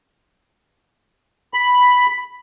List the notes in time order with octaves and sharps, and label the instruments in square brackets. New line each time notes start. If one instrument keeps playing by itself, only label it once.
[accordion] B5